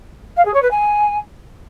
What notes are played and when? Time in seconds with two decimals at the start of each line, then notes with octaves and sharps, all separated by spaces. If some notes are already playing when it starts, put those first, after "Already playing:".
0.37 F5
0.45 G#4
0.54 C#5
0.62 B4
0.71 G#5